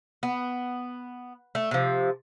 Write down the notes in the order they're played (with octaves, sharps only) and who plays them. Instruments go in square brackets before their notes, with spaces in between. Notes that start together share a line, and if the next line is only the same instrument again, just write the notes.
[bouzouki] B3
A3
C3 F3